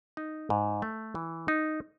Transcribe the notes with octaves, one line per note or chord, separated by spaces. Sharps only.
D#4
G#2
A3
E3
D#4